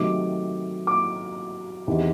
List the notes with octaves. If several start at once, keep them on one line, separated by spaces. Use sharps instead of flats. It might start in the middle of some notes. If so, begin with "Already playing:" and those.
Already playing: C3 D#3 F#3 A3 D6
D6
E2 C3 D#3